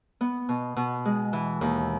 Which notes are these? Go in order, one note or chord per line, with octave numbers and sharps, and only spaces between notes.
B3
B2
B2
G#3
E3
D#2